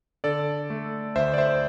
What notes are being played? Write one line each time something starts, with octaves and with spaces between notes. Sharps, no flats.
D3 A4 D5
A3
D2 C5 E5
D5
C5 E5